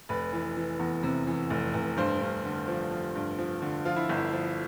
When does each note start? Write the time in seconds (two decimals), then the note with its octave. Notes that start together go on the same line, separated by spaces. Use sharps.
0.09 F1 B4
0.33 E3
0.57 E3
0.79 E2
1.03 C3
1.27 E3
1.50 F1
1.74 F1
1.97 G2 C5
2.21 G2
2.45 D3
2.68 F3
2.91 F3
3.15 G2
3.38 F3
3.62 D3
3.85 F3 F4
3.96 E4
4.09 G1
4.18 E4
4.33 F3